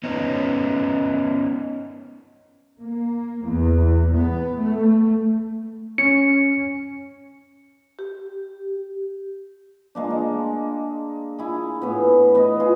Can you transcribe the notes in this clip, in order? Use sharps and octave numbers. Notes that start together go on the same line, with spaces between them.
B3 C#4 D#4
A#3
E2
B3
A3
C#4 C#7
G4
G#3 A#3 D4
G#3
E4 G#4
A2 B3
B3 E4 D#5
F4 G#4